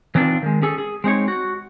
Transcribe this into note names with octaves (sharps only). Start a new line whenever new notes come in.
E3 F#3 C4 D4 D#4 F4
D#3 G#3
C#4 G#4 A4
G#4
G#3 C4 D#4 C#5
F#4